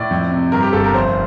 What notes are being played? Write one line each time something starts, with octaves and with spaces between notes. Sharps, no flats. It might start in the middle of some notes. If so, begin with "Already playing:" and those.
Already playing: A2 D5
F2
C3
G2 A#4
G4
G1 A4
A#4
F1 C5